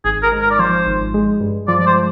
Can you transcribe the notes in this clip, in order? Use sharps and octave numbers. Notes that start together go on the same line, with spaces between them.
G#1 G#4
A#4
G#2
A#4
D5
F3 C5
G#1
G#3
G2
F3 D5
D5
C5